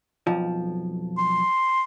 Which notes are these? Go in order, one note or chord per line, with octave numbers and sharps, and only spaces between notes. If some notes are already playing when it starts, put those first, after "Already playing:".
B1 F2 F3
C6